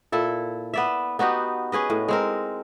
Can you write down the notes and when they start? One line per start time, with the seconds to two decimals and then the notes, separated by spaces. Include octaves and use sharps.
0.12 A#2 E4 A4
0.74 B3 D5 E5
1.19 B3 D#4 F#4 G4
1.72 C#4 G#4 B4 D#5
1.90 A2
2.08 G#3 C4 A#4